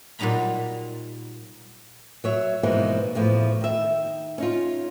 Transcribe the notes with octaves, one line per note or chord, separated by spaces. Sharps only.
A#2 F#3 G3 D#4 A#5 B5
F#3 C#5 E5
G#2 B2 E3 F3 A#3
E2 A2 F3
D#3 E5
C#4 D#4 F4